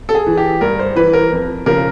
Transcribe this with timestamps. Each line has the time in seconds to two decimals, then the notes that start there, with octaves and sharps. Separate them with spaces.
0.09 A4
0.15 G#4
0.27 E3
0.37 G4
0.61 G2 A#4
0.79 C5
0.96 E3 B4
1.13 A#4
1.32 F2
1.66 C#3 F3 A#4